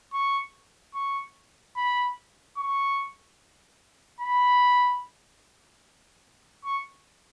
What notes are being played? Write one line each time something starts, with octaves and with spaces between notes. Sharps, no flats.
C#6
C#6
B5
C#6
B5
C#6